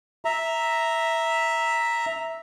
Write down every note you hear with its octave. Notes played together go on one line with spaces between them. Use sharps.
E5 A#5